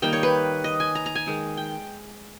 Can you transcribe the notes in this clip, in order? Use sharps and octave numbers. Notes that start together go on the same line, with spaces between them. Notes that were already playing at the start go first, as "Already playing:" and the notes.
D#3 G3 A#3 D#4 G5
C#5
B4
D#5
G#5
A#5
A#5
G#5
D#3 G#3 D#4
G5